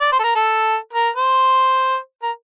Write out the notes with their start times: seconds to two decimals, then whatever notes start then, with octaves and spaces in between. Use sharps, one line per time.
0.01 D5
0.12 C5
0.20 A4
0.24 A#4
0.36 A4
0.93 A#4
1.16 C5
2.22 A#4